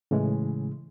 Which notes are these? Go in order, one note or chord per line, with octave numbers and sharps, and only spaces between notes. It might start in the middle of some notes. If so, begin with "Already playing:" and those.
A2 C#3 E3 G#3